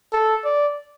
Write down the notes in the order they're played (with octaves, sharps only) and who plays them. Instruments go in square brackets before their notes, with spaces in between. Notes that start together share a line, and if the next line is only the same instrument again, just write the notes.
[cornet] A4
D5